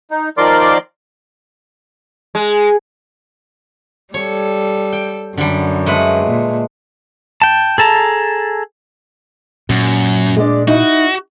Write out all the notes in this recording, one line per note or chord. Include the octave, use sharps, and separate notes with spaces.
D#4
D#3 F3 A#4 D5 C6 D6
G#3
G3 A4 C#5
G5
F#2 D3 G3
G#3 A3 B4
A#2
G5 A5
G#4 A4 A5 A#5
F#2 A#2
G#3 D4 D5
D#4 E4 F#4